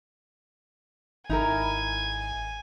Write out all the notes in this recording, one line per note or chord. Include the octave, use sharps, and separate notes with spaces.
G#1 D#4 E4 A#4 G#5